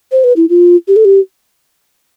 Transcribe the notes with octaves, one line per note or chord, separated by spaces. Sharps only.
C5
B4
E4
F4
G4
A4
G4